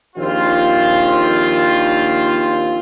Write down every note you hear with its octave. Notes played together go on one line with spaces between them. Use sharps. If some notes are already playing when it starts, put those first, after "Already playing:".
A#1 D#2 C4 F4